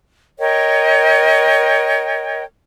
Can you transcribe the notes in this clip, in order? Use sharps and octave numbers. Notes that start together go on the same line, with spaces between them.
A#4 C#5 D#5 G5